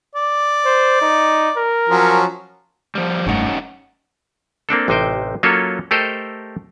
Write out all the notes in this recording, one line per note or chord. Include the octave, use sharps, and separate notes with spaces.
D5
C5
D#4
A#4
F3 F#3 C#4
F3 G3
F1 G2 A3 C#4 D#4 F#5
A#3 C4 D4 A4
A1 C3 D#4 C5 G5
F#3 A#3 C#4 F4 A4 C#5
A3 G4 A4 A#4 C5 D#5